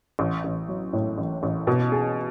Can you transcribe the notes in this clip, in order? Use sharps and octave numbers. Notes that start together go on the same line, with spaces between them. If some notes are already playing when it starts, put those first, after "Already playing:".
A1
A1
F#3
A2
A1
A1
B2
G#4